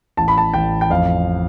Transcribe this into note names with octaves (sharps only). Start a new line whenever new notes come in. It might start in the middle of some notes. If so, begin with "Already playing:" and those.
A1 A5
B5
A5
A1 G5
G5
F2 F5